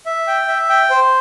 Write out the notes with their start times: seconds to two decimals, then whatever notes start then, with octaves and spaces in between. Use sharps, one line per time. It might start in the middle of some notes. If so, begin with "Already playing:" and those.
0.06 E5
0.27 G5
0.48 E5
0.69 G5
0.90 C5